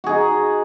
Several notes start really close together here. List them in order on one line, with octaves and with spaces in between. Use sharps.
F#4 G#4 D#4